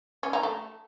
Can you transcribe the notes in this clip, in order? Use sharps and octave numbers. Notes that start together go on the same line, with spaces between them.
C#4
D#4
A3